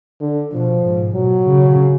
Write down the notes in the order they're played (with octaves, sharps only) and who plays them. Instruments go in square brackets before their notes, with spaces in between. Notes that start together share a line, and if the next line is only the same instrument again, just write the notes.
[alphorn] D3
[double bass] B2 [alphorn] F3
[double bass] G#2
[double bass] B2 [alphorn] F#3
[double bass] C#3